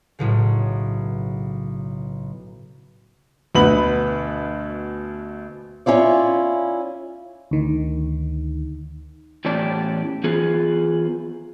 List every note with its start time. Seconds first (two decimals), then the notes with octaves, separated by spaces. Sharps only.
0.19 B1 A2 C#3
3.55 D2 B2 B3 B4 B5 F#7
5.86 C#4 E4 F4 D5
7.51 D2 D#3
9.45 E2 A2 C#4 G4 D5 A5
10.24 E3 B3 F4 G#4